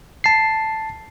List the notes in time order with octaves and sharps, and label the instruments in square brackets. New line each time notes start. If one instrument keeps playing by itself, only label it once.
[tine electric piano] A5 C7